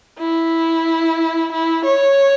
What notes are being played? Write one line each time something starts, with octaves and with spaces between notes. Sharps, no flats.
E4
E4
C#5